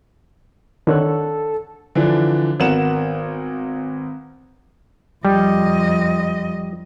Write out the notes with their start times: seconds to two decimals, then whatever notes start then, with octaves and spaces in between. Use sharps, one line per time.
0.87 D3 D#3 A4 C#5 F#6
1.95 D3 E3 F3 D4
2.60 G#1 B3 A#4 F#5 E7
5.25 F2 G3 D#5